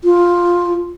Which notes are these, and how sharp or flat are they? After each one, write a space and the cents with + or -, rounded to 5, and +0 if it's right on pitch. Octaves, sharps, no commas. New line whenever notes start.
F4 +5